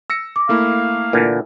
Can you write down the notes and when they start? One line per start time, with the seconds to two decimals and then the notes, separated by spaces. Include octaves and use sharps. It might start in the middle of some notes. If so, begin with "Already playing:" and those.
0.10 E6 A#6 C#7
0.36 D6
0.49 A3 A#3 E4 F5
1.13 A#2 D3 E3